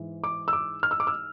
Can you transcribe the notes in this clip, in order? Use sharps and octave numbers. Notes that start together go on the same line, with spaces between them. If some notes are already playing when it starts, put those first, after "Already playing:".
Already playing: G#2 E3
D6
E6
D6
F6
E6
D6
E6